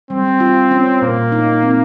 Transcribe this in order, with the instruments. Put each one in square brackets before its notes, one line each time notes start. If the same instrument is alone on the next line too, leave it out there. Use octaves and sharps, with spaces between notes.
[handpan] G3 [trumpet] C4
[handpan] F4
C#4
[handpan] A#2 [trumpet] A#3
[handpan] D#4
C4